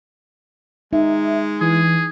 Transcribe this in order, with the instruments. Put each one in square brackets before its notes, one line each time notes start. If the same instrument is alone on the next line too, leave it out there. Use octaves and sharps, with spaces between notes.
[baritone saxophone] G#3 [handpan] D#4 [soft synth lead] E5
[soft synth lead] E3 [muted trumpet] G#4